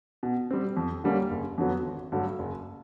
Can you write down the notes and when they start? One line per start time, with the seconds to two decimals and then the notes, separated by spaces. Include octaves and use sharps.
0.23 B2
0.51 G3 C4
0.77 F2
1.04 D3 G3 A#3 C#4
1.31 F#1
1.58 F2 D3 F#3 B3
1.85 G#1
2.12 G2 D3 F#3 A3
2.39 F#1